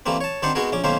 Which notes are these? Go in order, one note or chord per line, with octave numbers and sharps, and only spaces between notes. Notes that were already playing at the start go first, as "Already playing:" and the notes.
E3 G3 A3 A#3 C4
C#5 A5
D#3 G3 C4 D4 C5 F#5
G#3 B3 D#4 F#4 G#4 A#4
A#1 C#4 D6
B1 D#3 A#3 C#4 C5 E5